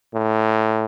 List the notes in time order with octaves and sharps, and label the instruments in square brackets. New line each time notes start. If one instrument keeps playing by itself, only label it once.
[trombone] A2